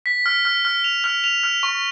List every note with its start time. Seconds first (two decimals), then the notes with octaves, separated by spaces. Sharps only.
0.06 B6
0.26 F6
0.45 F6
0.65 F6
0.84 F7
1.04 F6
1.24 F7
1.44 F6
1.63 C#6